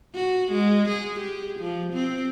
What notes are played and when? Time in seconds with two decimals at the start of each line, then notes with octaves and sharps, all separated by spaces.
0.15 F#4
0.52 G#3
0.89 G#4
1.20 G4
1.60 F3
1.93 C4